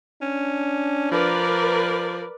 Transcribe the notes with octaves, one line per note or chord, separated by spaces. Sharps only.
C#4 D4
F3 A#4 B4 D5